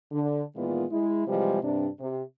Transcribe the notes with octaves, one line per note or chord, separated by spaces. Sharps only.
D3
A#2 D#3 E3 G#3 B3 F4
G#3 E4
C3 E3 F3 G3 G#3
G2 C3 D4
C3